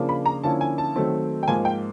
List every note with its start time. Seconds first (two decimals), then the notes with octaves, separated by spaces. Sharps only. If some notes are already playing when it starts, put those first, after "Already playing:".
Already playing: C#3 F3 A#3 D4
0.09 B5
0.26 A#5
0.43 D3 F3 A#3 C#4 E4 A5
0.61 G#5
0.78 A5
0.96 D#3 F#3 A3 C4
1.43 G5
1.48 G#2 F3 A#3 G#5
1.65 G5